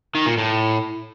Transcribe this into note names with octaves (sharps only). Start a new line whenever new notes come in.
D#3
A#2
A2